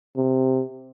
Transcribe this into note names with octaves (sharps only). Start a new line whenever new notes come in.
C3